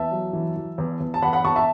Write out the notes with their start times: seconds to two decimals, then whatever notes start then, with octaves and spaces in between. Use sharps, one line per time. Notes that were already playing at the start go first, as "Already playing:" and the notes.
Already playing: E2 E5 A5
0.11 F#3
0.33 E3
0.56 E3
0.78 E2
1.00 E2
1.14 A5
1.22 E2 F#5 B5
1.33 F#5 B5
1.45 E2 A5 C#6
1.56 E5 A5